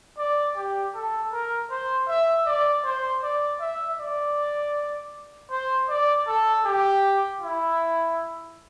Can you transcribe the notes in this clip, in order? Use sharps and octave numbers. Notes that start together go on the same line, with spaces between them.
D5
G4
A4
A#4
C5
E5
D5
C5
D5
E5
D5
C5
D5
A4
G4
E4